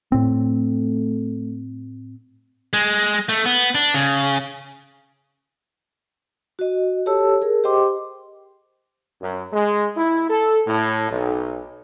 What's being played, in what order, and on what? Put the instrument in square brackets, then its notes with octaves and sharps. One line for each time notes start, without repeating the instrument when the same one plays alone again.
[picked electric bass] A2 C4 [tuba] A3
[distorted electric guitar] G#3
A3
B3
D4
C#3
[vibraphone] F#4 D#5
G4 A4 C#5 A5 E6
G#4 A#4
G4 C5 D#5 G5 C6 D6
[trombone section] F#2
G#3
E4
A4
A2
B1